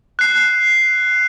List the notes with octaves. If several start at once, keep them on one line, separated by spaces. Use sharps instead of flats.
F#6 C7